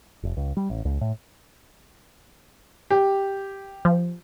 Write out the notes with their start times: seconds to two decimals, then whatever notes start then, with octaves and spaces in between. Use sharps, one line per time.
0.23 F1
0.37 C#2
0.57 G3
0.70 A1
0.85 C#2
1.01 A2
2.90 G4
3.85 F3